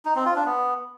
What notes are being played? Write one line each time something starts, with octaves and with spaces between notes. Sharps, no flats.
D#4
C4
F4
D4
B3